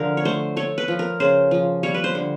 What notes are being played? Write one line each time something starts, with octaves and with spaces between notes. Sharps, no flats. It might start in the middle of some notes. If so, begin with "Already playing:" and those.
Already playing: D3 F3 A#4
C#5
A3 C5
A3 C#5
B4
F3
A#4
C#3 C5
F3
G3 C#5
B4
C5
D3